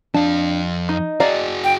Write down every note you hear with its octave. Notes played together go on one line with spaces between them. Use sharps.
F2 D4 F5 A5
D#4 D#5
F#4 G#4 D5 F5 A#5
G5